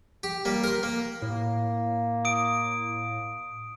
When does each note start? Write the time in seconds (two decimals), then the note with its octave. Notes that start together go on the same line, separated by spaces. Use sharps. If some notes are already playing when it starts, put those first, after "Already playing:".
0.23 G4
0.45 G3 A#3
0.64 A#4 C6
0.83 A#3
1.22 A2 A#3
2.25 D#6 D7